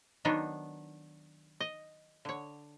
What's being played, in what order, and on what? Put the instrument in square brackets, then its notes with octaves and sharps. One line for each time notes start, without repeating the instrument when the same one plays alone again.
[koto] D#3 F#3 B3 D4 D#4
D#5
D3 C#5